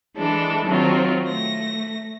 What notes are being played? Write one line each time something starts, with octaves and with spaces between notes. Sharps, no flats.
E3 G#3 D4 A4
D#3 F#3 C4 F4
A3 A#6